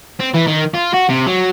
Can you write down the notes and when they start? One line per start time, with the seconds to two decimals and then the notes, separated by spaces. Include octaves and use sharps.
0.20 C4
0.35 E3
0.47 D#3
0.75 F4
0.94 F#4
1.10 C3
1.27 F#3